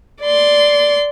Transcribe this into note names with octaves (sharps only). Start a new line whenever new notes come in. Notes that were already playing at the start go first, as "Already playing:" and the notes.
D5 C6